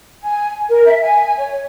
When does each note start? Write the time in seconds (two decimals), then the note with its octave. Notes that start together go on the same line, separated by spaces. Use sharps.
0.22 G#5
0.70 A#4
0.85 E5
1.03 G#5
1.36 C#5